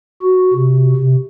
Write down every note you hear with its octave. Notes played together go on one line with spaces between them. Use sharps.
F#4
C3
C3